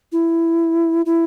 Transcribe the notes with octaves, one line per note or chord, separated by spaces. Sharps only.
E4
E4